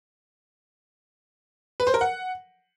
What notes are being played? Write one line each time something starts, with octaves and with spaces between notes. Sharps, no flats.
B4
C5
A#4
F#5